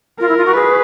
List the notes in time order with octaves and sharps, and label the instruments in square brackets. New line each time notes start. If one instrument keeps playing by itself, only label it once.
[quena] F4 [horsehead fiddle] A#4
[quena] E4
F4
F#4
[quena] G#4 [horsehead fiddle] B4